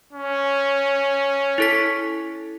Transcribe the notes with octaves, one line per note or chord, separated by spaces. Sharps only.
C#4
E4 A4 B6